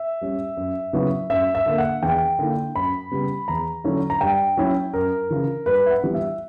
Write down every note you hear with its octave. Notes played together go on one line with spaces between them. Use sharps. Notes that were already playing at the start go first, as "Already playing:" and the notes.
Already playing: E5
G3 C#4
F#2
C#3 F#3 B3 E4
F#2 E5
E5
D3 A#3
F#5
E2 G5
D3 A#3 E4
F#2 B5
C#3 G3 B3
E2 A#5
D3 F#3 C#4 E4
A#5
G2 G5
F#3 C#4 E4
F#2 A#4
C#3 E3
G2 B4
E5
F#5
E3 G3 B3 E4
E5